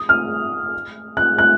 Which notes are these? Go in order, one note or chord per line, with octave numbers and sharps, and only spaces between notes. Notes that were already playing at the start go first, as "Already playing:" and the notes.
Already playing: D#6
F6
F#6
F#6